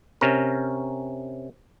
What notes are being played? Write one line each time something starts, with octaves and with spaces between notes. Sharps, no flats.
C3 C#4 A#4